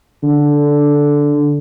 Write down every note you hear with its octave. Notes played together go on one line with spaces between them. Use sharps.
D3